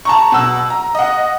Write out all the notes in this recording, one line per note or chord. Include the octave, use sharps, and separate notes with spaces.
A5 A#5 C#6
B2 E6
A#5
D#5 F#5